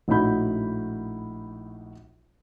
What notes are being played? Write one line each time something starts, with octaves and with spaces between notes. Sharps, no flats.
A#1 A2 D#4 F#4 B5 G6